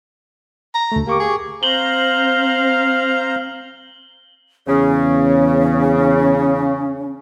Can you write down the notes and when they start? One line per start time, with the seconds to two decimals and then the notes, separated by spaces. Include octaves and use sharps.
0.74 A#5
0.92 D2 A3
1.07 A#3 G4 C#6 D6
1.20 G#4
1.63 C4 C5 F5 A#5 F#7 G7
4.67 E2 C#3 C#4